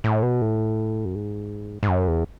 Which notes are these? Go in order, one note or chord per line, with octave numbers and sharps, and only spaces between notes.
A2
B2
A2
F#2
G#2
G#2
F#2
E2